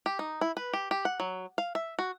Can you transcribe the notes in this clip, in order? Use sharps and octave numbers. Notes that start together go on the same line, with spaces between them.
G4
D#4
E4
B4
G4
G4
F#5
F#3
F5
E5
F#4